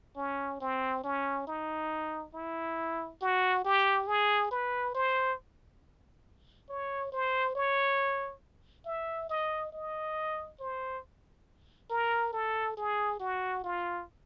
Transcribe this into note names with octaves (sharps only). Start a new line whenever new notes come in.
C#4
C4
C#4
D#4
E4
F#4
G4
G#4
B4
C5
C#5
C5
C#5
E5
D#5
D#5
C5
A#4
A4
G#4
F#4
F4